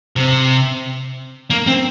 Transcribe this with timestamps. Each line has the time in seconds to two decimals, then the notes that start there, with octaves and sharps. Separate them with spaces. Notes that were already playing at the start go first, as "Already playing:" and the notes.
0.16 C3
1.50 A#3
1.67 C4